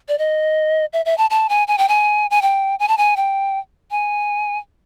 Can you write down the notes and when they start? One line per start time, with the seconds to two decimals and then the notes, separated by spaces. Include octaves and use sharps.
0.08 D5
0.18 D#5
0.93 E5
1.05 E5
1.18 A5
1.30 A5
1.49 G#5
1.68 G#5
1.78 G5
1.88 G#5
2.31 G#5
2.42 G5
2.79 G#5
2.88 A5
2.98 G#5
3.17 G5
3.91 G#5